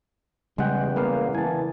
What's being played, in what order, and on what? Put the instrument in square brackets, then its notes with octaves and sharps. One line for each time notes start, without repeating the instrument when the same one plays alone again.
[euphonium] E2 [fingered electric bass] C#3 G3 [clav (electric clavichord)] G#3 F#5 G5
[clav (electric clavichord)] A#3 B3 F5
[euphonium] E3 [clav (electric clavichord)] G#5 A5